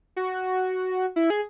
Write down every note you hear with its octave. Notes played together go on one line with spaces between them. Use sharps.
F#4
E4
G#4